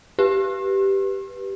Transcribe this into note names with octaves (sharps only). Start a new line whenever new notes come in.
G4 B4